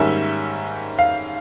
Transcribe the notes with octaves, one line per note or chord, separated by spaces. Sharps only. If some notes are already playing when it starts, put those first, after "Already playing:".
Already playing: G#2 D#3 G3 A#3 C#4 E5
F5